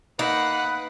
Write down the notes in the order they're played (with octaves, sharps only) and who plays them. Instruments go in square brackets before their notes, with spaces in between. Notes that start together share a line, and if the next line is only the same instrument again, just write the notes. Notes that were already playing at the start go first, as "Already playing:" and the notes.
[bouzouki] A#3 [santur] D#4 [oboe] B4 [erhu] F#5